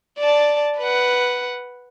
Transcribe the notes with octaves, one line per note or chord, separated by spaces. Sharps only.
D5 A5
B4 F#5